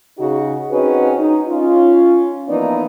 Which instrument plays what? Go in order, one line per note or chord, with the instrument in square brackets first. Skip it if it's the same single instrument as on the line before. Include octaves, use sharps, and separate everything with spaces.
[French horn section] C#3 D#4 F#4
C4 C#4 D#4 F#4 G#4 B4
D#4
C#4 F4
E3 F3 A#3 B3 D#4 D5